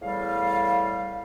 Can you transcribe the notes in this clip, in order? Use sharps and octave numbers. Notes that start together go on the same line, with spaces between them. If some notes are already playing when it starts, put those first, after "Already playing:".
E2 A2 G3 F5